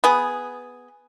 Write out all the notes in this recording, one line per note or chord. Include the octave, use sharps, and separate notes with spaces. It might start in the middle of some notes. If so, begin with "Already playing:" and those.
B3 G#4